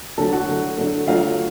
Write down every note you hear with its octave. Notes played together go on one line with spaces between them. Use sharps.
D3 F#3 A3 A4 A5
F#4 F#5
D3 F#3 A3
D3 F#3 A3
D3 F#3 A3 F4 F5